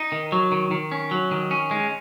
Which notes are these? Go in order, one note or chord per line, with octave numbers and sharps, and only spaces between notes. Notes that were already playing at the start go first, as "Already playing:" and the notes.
Already playing: D#4
D#3
F#3
D#3
D#3
C#4
F#3
D#3
C#4
G#3